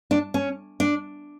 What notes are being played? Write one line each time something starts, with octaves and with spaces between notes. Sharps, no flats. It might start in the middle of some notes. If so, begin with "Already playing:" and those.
D4
C#4
D4